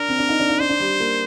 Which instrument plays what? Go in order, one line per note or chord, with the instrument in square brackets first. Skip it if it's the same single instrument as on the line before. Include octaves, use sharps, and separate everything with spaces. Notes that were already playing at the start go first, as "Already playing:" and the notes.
Already playing: [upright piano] D4 [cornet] A#4
[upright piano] C4
D4
D#4
D4
D#4
[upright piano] D4 [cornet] C5
[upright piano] D4
G3
A#3